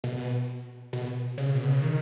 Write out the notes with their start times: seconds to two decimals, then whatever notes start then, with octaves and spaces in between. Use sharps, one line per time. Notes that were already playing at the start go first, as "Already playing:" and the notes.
0.04 B2
0.93 B2
1.38 C#3
1.55 B2
1.68 C#3
1.82 D#3